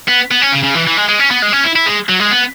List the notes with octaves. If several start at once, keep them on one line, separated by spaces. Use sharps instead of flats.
B3
B3
C#4
C#3
C#3
E3
E3
G#3
G#3
C#4
B3
G#3
C#4
E4
E4
G#3
F#3
G#3
B3